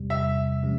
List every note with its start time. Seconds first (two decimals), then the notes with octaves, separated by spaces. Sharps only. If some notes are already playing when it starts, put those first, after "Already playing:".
Already playing: E2 C3 G3
0.10 E5
0.63 C3 F3 G#3 C#4